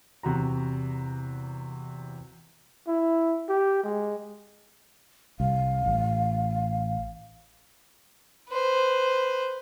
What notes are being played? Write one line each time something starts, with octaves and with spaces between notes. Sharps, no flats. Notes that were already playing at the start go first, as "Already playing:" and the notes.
E2 C3 F#4 A#5
E4
G4
G#3
C2 F5
A1
B4 C5